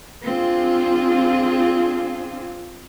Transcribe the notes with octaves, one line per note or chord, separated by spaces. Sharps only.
C4 D4 F4 G#4